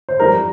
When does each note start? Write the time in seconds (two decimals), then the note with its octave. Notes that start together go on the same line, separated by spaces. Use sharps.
0.09 C5
0.19 F2 E3 G3 A#4